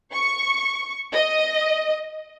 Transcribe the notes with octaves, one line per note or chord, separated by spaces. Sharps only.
C#6
D#5